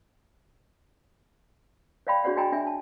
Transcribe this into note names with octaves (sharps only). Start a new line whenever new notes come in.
C#5 D5 F5 G5 B5
D4 F#4 G#4 C#5 D5 F#5
F#4 D#5 G5 G#5 A#5 B5
D4 E5 G#5
A5